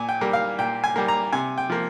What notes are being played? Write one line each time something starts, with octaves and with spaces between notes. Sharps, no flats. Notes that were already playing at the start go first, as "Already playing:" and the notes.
Already playing: A#2 G#5
G5
G3 A#3
F5
A#2 G5
G#5
G3 A#3
A#5
C3 G#5
G5
F3 A#3